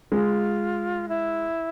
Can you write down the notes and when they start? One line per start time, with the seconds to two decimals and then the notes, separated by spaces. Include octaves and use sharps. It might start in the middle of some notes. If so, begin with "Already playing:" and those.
0.12 G#3 F4
1.09 E4